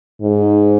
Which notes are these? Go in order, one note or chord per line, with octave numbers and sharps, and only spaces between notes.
G#2